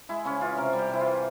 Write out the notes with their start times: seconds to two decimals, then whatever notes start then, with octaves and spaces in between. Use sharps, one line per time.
0.09 G#3 E4
0.25 C#3 C#4
0.41 E3 F4
0.57 C3 A#4
0.73 G3
0.79 G4
0.89 C3 E4
1.00 F4
1.06 E3